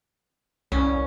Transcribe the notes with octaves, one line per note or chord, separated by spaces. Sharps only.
C2 C#4